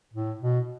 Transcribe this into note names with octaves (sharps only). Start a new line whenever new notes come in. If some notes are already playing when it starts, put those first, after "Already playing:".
A2
B2